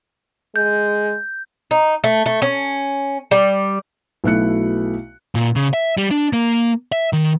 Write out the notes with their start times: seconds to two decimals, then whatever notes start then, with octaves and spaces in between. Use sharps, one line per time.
0.56 G#3 G6
1.71 D#4
2.04 A3
2.26 A3
2.42 C#4
3.31 G3
4.24 B1 B2 A3 E4 F#6 C#7
5.35 A#2
5.56 C#3
5.73 E5
5.97 G3
6.11 D4
6.33 A#3
6.92 E5
7.13 D#3